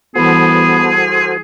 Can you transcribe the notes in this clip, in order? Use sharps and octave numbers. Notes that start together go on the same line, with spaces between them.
E3 G3 B3 F#4 G#4 A4 C5